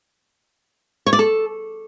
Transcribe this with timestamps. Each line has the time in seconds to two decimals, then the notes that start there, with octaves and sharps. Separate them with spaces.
1.06 C#5
1.13 D5
1.19 A4